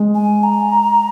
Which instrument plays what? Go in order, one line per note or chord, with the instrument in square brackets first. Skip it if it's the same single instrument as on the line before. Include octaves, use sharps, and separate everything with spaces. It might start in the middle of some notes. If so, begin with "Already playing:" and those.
Already playing: [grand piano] G#3
[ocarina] G#5
A#5